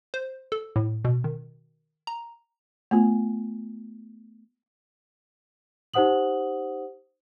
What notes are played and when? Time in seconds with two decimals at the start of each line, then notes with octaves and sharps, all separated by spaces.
0.14 C5
0.52 A4
0.76 A2
1.05 B2
1.24 D#3
2.07 A#5
2.91 A3 B3 F4
5.94 D#4 G4 C5 F#5 D#6 F#7